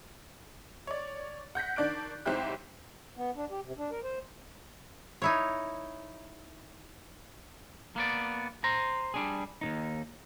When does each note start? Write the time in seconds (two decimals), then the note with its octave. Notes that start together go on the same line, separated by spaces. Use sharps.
0.87 C#5 D5
1.55 F#5 G6 A#6 B6
1.76 D#3 D4 D5 F#6 D7
2.26 B1 G#2 C4 E4 G4 F#6
3.16 B3
3.35 D4
3.50 G4
3.64 C3
3.77 D4
3.91 A#4
4.04 C5
5.22 D#4 E4 C#5
7.96 A#3 B3 D5
8.64 C5 A#5
9.14 G3 D4 G#4
9.61 D#2 D#3 D#4